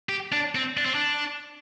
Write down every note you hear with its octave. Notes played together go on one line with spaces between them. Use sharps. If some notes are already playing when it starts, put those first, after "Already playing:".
G4
D4
C4
D4
C4
D4